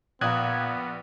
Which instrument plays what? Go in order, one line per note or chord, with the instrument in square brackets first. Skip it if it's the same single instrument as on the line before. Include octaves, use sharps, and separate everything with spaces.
[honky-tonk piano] A#1 [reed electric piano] A#2 F5 A#5 [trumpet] B3 [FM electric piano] D#6 F#6 G#6